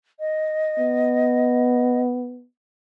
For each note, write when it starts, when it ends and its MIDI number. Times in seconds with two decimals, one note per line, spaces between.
0.19 2.00 75
0.79 2.44 59